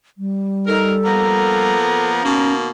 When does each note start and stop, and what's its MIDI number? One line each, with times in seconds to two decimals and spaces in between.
0.18 1.74 55
0.66 0.93 63
0.66 2.10 69
0.66 0.91 70
1.04 2.21 53
1.04 2.21 58
1.04 2.21 59
1.04 2.52 82
2.23 2.69 47
2.23 2.69 51
2.23 2.69 58
2.23 2.53 61